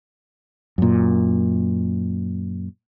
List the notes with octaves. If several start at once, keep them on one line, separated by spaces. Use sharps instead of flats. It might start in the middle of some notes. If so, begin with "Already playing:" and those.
F#2 A#2